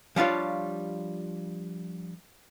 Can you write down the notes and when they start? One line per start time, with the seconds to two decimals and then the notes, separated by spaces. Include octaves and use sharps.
0.16 F3 G3 D4 F4 C#5